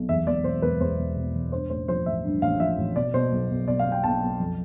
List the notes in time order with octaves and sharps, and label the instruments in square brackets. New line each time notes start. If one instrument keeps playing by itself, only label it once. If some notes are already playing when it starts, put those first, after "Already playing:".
Already playing: [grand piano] B1
E2 E5
E1 D5
B2 C5
E1 B4
E2 C5
E1
B2
E1
G2 C5
A1 C5
F3 C5
A1 E5
G2
A1 F5
F3 E5
A1
B2 D5
B2 C5
B1
B1
B2 D5
F5
B2
G5
B1 A5
B1
F2